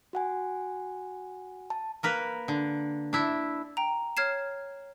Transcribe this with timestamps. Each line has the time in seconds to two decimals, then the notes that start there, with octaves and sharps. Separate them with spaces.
0.13 F#4 F#5 G#5
1.70 A5
2.03 A#3 A#4 B4
2.48 D3
3.13 D4 E4
3.77 G5 A#5
4.17 C#5 F6 G#6 C7 E7